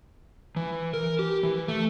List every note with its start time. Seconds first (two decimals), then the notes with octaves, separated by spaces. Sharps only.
0.56 E3
0.94 A#4
1.19 G4
1.43 E3
1.68 A3